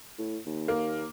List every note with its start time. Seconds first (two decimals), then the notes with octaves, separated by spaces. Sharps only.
0.18 A2
0.46 D#2
0.68 A#3